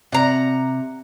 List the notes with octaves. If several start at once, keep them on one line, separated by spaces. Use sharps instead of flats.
C3 F#5 A#5